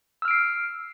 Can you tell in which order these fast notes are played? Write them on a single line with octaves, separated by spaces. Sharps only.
E6 F6 D7 C7